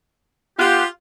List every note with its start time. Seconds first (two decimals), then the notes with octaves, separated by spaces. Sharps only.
0.59 B3 F4 G4 F5 F#6